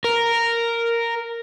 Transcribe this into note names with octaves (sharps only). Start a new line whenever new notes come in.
A#4